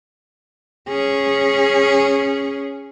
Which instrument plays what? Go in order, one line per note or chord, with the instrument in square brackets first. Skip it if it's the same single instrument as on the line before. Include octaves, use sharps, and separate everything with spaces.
[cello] C#4 G#4